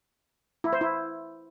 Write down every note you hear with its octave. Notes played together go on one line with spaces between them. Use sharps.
E4
C5
E4